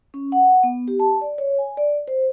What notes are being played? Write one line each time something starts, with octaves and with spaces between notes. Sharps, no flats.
C#4
F#5
B3
G4
A5
D5
C#5
G#5
D5
C5